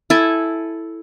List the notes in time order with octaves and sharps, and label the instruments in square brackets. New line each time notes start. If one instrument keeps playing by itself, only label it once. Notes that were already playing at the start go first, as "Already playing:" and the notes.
[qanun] E4 A4 G#5